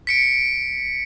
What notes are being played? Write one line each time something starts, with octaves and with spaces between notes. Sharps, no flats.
B6 C#7 D7